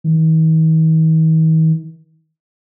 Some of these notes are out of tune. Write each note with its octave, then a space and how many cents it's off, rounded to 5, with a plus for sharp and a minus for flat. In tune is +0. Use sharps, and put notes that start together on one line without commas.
D#3 +45